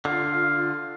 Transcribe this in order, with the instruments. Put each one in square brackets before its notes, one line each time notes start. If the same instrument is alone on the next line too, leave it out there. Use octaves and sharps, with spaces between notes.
[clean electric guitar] D3 [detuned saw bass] F4 [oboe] F5